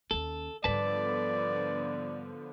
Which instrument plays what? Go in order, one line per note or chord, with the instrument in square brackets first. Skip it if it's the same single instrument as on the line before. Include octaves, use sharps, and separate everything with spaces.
[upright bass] D#2 C#4 [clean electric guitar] A4
[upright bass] G#2 G3 [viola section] D3 F3 B3 [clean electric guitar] B4 A5 [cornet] D5